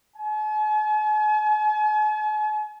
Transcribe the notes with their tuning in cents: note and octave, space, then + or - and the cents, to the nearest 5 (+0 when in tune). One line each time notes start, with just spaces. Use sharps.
G#5 +45